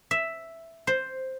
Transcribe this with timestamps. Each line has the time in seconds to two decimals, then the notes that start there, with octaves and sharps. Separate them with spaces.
0.11 E5
0.87 C5